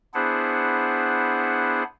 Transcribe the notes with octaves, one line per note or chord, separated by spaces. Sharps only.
B3 D4 E4 G#4 C5 F#5